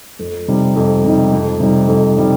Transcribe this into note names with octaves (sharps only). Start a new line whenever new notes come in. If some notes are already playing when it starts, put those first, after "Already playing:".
F2
C3 G3 D#4
F2
C3 G3 D#4
F2
C3 G3 D#4
F2
C3 G3 D#4